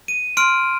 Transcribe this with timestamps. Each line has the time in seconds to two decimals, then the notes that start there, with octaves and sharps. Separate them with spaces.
0.08 D#7
0.37 C6 F6 D7